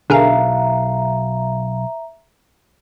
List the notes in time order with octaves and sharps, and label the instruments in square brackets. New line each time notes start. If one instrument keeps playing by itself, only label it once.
[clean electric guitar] B1 F5 [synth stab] D3 G#4 A#4 [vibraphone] E5 A#5